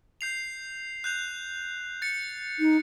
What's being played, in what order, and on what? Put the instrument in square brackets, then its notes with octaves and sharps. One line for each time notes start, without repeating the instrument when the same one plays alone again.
[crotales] G6 C7 F7
F#6 G6 F7
A6 C#7
[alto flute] D#4